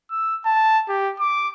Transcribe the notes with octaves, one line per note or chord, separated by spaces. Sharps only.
E6
A5
G4
D6